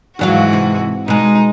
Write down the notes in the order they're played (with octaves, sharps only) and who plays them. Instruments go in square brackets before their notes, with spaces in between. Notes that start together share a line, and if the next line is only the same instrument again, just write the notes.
[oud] D#2 F#3 F5 [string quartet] G#2 E3 F#4
[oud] C3
[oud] B2 G#3 [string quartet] D#4